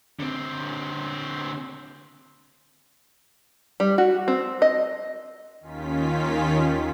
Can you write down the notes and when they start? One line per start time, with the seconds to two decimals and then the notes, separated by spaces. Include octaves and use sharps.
0.19 D3 C4
3.80 G3
3.98 F#4
4.28 C4
4.62 D#5
5.60 D#2 D#3 C#4 F4 B6